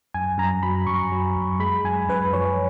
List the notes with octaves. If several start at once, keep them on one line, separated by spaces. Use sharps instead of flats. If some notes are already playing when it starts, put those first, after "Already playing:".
F#2 G#5
F#2 A#5
F#3 B5
F#2 C#6
F#3
F#2
G#3 B5
F#2 G#5
F#2 B4
F3 C#5